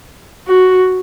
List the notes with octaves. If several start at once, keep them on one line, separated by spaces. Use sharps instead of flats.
F#4